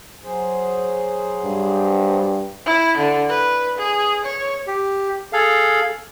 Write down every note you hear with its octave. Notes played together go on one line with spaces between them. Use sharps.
F#3 G#4 C5
G2
E4
D3
B4
G#4
C#5
G4
G#4 A4 F5